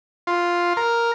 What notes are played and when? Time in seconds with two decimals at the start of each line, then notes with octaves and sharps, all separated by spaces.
0.27 F4
0.77 A#4